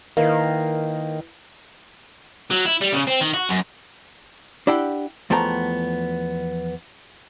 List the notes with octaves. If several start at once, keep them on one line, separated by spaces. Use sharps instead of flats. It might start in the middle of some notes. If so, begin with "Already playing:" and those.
D#3 A#3 E4 B4 D#5
F#3
E4
G3
C#3
C4
D#3
F#4
F#2
D4 E4 G4 F#5 G5
E2 F3 A3 B3 G5 A#5